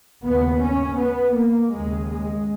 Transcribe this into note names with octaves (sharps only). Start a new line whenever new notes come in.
D#2 C#3 B3
C#4
B3
A#3
D#2 C#3 G#3
G#3